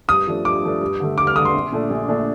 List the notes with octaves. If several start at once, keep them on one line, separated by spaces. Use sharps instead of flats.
G2 D#6
F3 A3 D4
G2 D6
F3 A3 D4
G2
D3 A3
G2 D6
F6
D3 A3 D#6
C6
A#1
A#2 A3 D4
A#1
A#2 A3 D4